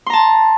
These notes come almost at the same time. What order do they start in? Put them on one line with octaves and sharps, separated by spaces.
C6 A#5 A5